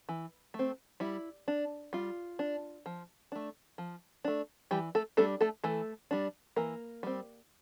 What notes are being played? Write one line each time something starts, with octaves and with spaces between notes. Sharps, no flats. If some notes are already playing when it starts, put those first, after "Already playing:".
E3
A3 C4
G3 E4
D4
G3 F4
D4
F3
A3 D4
F3
A3 D4
E3 G3 G4
A3 A4
G3 A3 D4 A4
A3 A4
E3 A3 A4
G3 D4
E3 A#3 A#4
G3 C4